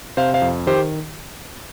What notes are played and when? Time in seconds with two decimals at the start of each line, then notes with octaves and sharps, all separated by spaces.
0.17 C3 C5 F5
0.34 C5 F5
0.42 F2
0.67 D#3 G4 C5